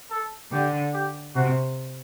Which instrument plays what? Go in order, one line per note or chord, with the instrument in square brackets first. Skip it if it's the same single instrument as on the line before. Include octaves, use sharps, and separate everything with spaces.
[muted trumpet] A4
[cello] D3 [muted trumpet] G4
[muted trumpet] G4
[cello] C3 [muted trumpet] F#4